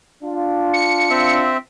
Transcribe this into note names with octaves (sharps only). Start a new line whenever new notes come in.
D4 F4
C#7
C4 E5